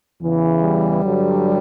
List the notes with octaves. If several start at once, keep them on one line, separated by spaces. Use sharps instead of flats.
E2 C#3 E3
G3
G2 D3 F#3